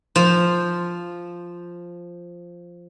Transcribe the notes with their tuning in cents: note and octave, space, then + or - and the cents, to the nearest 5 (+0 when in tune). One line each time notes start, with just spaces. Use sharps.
F3 +0 C5 +0